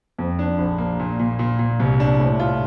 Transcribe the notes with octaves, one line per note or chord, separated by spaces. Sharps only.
F2
D4
A#1
A#3
A#2
A#2
A#2
A#2
C2
D4
A2
F4